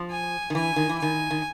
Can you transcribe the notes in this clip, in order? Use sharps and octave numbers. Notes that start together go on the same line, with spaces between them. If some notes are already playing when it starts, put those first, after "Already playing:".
Already playing: F3
G#5
D#3
E3 G#5
D#3
E3
D#3 G#5
D#3